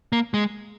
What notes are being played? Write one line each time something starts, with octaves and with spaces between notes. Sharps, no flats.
A#3
G#3